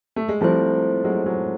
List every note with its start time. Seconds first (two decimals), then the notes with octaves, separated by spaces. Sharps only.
0.16 A3
0.28 G#3
0.41 F3 G3 A3 C4 E4 A4 C5
1.04 F#3 G#3
1.26 F#3 G#3